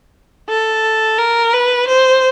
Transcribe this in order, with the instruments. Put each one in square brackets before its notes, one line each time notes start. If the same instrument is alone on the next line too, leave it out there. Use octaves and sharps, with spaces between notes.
[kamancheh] A4
A#4
B4
C5